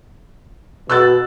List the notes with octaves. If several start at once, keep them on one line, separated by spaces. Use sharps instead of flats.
B2 E6 F#6 A6